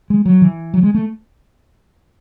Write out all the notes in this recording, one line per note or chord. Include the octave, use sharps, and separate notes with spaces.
G#3
F#3
E3
F#3
G#3
A3